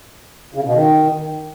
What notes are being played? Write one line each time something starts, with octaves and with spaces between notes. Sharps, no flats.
C#3
B2
D#3